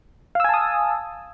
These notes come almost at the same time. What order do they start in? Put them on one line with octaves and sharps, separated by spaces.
F5 E6 G#5 A5 D#6